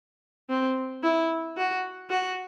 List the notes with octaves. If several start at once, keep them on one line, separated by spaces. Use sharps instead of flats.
C4
E4
F#4
F#4